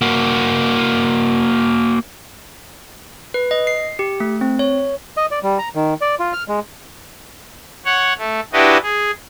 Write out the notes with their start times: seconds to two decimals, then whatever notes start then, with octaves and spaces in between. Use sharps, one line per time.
0.02 A#3 F#4
3.34 B4
3.51 D#5
3.67 C7
3.99 G4
4.20 A3
4.41 C4
4.59 C#5
5.17 D#5
5.31 D5
5.43 G3
5.58 A#5
5.75 D#3
6.01 D5
6.19 F4
6.33 F6
6.48 G#3
7.85 C#5 F#5
8.18 A3
8.53 D4 E4 F#4 G4 B4 D#5
8.83 G#4